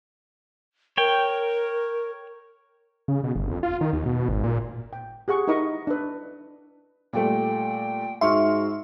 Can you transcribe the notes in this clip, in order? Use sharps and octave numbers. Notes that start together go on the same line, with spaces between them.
A#4 C#5 G5
C#3
B2
G1
F2
F4
D#3
D#2
B2
G#1
A#2
G5
G4 G#4 F#5 C#6
D#4 E4 A#4 D#5 B5 C#6
D4 B4
A#2 G3 A3 G5
G#2 F#4 E5 C6 C#6 F6